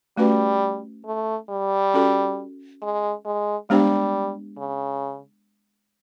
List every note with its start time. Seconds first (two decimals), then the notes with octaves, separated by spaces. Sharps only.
0.17 G3 A3 C#4 F#4 B4
1.05 A3
1.50 G3
1.94 C#4 F#4 A4
2.82 G#3
3.26 G#3
3.70 G3 G#3 B3 D4 G4 C5
4.58 C#3